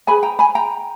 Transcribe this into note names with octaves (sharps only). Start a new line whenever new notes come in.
D#4 G#4 B4 G#5 B5
G5 A#5
G#5 B5
G5 A#5